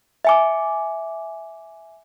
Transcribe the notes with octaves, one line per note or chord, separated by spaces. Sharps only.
E5 G#5 D6